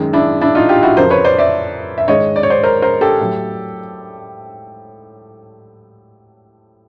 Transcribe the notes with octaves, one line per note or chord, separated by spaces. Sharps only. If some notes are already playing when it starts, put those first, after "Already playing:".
Already playing: F#2 D#3 G#3
D4 E4
D4 E4
D#4 F4
F4 G4
E4 F#4
F2 C#3 F3 A#4 C5
B4 C#5
C5 D5
D5 E5
E5
G#2 D#3 G#3 C#5 D#5
D5
C#5
C5 D5
A#4 C5
A#4 C5
G4 A4
A2 F#3